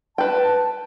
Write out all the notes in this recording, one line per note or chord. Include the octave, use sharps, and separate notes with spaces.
B4 G5 A5